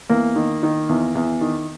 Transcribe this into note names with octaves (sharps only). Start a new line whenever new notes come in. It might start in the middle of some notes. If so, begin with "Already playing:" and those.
E2 A#3
D#3
D#3
E2
E2
D#3